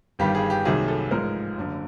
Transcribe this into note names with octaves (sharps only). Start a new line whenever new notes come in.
G1 G2 D#3 G3 G4
G#4
G4
C2 C3 D#3 F#3 A#3 G#4
A4
A1 G#2 F3 G#3 A#4
F#1 F#2 D3